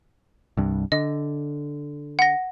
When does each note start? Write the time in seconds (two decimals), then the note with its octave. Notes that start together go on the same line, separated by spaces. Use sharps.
0.57 C2 G2
0.92 D3 D#5
2.19 F#5 A#6